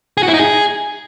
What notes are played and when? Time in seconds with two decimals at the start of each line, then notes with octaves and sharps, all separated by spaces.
0.17 G#4
0.23 F#4
0.28 E4
0.34 D#4
0.39 G#4